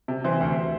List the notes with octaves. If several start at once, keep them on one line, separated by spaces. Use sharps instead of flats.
C3
E3 C5 E5
D2